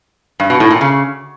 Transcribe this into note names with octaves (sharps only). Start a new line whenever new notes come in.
G2
B2
A2
A#2
C#3